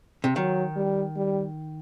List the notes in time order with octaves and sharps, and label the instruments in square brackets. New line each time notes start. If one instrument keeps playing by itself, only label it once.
[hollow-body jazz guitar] C3
[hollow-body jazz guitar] D#3 [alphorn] F#3
[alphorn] G3
G3